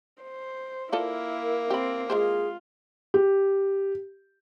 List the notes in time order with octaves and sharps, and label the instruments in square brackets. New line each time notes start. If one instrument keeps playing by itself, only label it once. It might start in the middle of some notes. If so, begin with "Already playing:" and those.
[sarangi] C5
[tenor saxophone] A#3 [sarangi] E4 [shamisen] F4 A4 D5 [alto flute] A#4
[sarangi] C4 [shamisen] G4 B5
[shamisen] G#3 A#4 C5 [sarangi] F4 [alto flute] G#4
[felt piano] G4